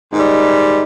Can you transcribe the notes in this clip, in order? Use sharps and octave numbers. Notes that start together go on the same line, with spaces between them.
G#2 D#3 G3 D#4